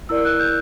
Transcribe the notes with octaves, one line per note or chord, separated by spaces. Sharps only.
E4 A#4 D5 E6
F#6
G6